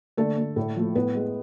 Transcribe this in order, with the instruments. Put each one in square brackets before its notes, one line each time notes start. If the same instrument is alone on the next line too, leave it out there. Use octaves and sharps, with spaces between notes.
[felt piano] D3 A3 A4
A3
A2
F3 A3
A2 B3 B4
G#3